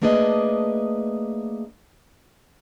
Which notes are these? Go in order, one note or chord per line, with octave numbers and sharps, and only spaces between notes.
A3 A#3 D4 G#4 B4 D#5